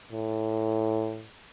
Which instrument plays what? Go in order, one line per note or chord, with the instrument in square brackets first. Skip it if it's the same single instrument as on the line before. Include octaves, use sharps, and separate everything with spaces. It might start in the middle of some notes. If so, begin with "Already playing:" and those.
[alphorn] A2